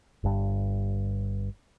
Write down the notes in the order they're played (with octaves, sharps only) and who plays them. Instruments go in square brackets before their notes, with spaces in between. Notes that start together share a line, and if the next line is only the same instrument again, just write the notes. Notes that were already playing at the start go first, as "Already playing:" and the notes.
[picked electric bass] G1 G2